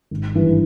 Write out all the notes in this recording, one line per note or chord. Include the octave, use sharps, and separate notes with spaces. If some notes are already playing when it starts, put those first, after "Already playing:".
G#1
G2 E3